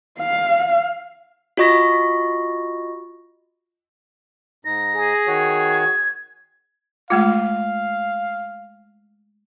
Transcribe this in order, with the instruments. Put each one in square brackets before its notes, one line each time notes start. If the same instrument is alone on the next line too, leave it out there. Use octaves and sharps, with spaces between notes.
[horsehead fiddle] F5
[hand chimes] F4 F#4 D#5 C#6 A#6
[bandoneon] G#2 D#4 [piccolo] A#6
[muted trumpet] G#4
[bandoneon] D#3 F#4 C#5
[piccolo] G#6
[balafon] G#3 A3 F4 [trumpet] F5